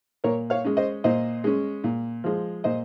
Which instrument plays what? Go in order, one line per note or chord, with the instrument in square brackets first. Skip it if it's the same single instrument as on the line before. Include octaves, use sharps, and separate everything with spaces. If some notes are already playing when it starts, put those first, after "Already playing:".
[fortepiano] A#2 A#4 C#5
C#5 F5
G#3 C#4
C5 D#5
A#2 C5 D#5
G#3 C#4
A#2
F3 G#3
A#2 C5 D#5